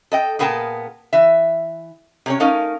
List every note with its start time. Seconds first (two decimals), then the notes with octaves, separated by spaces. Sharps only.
0.12 A4 D#5 G5
0.39 A#2 B3 G#4 A#4 G5 A5
1.13 E3 E5
2.26 C3 C#4 C#5
2.40 A3 C#4 D#4 A#4 F5